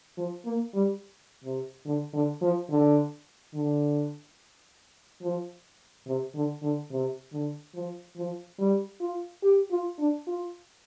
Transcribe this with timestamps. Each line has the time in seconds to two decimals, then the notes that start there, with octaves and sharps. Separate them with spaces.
0.18 F3
0.45 A#3
0.74 G3
1.44 C3
1.86 D3
2.14 D3
2.42 F3
2.70 D3
3.54 D3
5.23 F3
6.07 C3
6.35 D3
6.62 D3
6.91 C3
7.32 D3
7.75 F3
8.16 F3
8.59 G3
9.00 F4
9.43 G4
9.71 F4
9.99 D4
10.27 F4